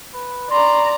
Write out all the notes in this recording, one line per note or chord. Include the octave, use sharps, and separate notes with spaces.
B4
D5 A#5 C6